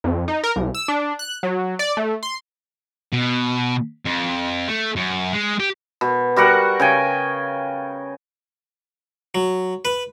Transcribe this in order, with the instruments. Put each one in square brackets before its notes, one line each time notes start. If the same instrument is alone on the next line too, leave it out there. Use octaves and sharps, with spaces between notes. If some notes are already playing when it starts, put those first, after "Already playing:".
[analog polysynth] F2
D#4
A#4
C2
E6
D4
F#6
F#3
D5
A3
C6
[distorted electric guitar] B2
F2
A3
F#2
G#3
G4
[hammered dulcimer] B2
G3 F#4 A#4 F#5
C#3 G5 G#5
[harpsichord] F#3
B4